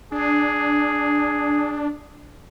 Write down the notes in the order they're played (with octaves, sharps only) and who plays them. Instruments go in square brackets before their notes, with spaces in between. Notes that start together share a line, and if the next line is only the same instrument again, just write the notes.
[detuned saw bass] D4 [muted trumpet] G#4